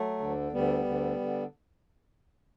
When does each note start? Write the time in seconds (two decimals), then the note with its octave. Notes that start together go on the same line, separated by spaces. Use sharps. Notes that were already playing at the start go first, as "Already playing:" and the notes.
Already playing: F#3 A3
0.19 D2 D3
0.52 D2 D3 G3 B3
0.85 D2 D3
1.19 D3